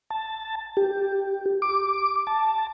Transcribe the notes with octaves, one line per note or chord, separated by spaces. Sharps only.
A5
G4
D6
A5